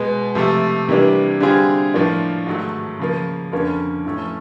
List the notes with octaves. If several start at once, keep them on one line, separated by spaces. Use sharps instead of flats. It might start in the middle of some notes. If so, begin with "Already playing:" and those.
Already playing: B2 G#3 B3
C3 F3 A3
C3 E3 G3 A#3 D4
D3 G3 C4 F4 G#4
A2 F3 A#3 D4 F4
G#2 D#3 F#3 A3
C#3 F3 A#3
F2 D3 F3 A#3 C#4
A2 F3 A3 C#4